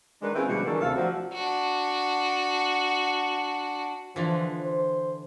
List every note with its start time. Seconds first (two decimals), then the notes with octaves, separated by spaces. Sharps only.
0.22 D#3 G#3 D4 B4
0.35 C4 C#4 E4 F4 G#4 B4
0.47 B2 D3 F3 G3 G#3 F#4
0.66 D#3 E3 C#4 D4 G#4 A4
0.81 D2 C3 A4 E5 F5
0.95 F3 F#3 C4 D4 F#4
1.33 D4 F#4
4.16 D3 E3 F3
4.61 C5